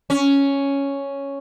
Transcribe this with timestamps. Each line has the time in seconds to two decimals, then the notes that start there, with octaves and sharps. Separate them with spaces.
0.10 C#4